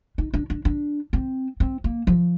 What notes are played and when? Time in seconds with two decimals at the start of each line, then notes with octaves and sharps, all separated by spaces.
0.18 D#4
0.34 D4
0.50 D4
0.65 D4
1.13 C4
1.60 C4
1.84 A#3
2.07 F3